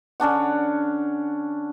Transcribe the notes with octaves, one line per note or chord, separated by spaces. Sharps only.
D3 C#4 D4 F#5